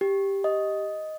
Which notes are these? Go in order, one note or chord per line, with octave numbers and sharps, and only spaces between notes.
G4
D#5